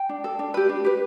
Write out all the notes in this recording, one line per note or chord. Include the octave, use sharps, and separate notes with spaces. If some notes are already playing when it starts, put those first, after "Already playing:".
Already playing: G5
D4
A4
D4
G4 B4
D4
G4 B4